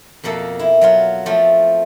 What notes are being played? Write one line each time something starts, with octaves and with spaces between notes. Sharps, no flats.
F2 B2 A#3 A4
E4
F#3 B3 F4
F3 A3 C4 F4